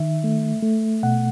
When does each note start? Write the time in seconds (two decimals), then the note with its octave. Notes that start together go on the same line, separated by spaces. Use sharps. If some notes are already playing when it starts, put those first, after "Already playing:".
Already playing: D#3 E5
0.24 A3
0.63 A3
1.03 B2 F#5